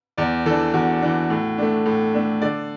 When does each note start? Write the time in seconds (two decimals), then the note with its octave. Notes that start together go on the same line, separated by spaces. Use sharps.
0.18 E2 D5
0.46 E3 D4 A4
0.73 E2 F#4
1.02 E3 D4
1.30 A2
1.58 A3 D4
1.86 A2
2.14 A3 D4
2.42 D3 D5